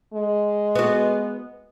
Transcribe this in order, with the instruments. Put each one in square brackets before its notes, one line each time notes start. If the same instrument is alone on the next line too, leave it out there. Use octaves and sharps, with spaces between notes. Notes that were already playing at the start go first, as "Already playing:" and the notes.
[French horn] G#3
[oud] B3 F#4